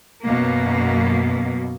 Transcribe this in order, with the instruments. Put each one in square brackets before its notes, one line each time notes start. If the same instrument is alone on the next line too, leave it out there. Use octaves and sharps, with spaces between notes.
[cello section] F#2 B2 A#3